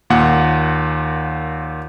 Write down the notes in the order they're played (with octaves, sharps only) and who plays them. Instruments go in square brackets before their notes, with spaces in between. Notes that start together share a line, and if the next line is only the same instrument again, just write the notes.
[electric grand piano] D#2 A#2 F#5